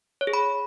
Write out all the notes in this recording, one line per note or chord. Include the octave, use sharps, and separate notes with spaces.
C#5
G#4
B5